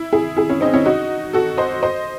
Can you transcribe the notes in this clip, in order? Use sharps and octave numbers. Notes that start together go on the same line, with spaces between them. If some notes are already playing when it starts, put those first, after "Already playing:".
Already playing: E4
E4 G#4
E4 G#4
C#4 E4
C4 D#4
C#4 E4
D#4 F#4
F#4 A4
C5 D#5
C5 D#5